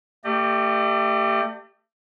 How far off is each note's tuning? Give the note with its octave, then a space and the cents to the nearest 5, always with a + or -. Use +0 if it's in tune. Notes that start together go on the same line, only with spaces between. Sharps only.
A3 +35 G4 +0 D#5 -45